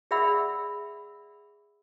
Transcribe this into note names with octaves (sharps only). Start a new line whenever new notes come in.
G#4 D5 E5 F#5 B5 E6